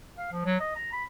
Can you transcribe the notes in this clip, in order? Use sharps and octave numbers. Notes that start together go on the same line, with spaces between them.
F5
F3
F#3
D#5
A#5
B5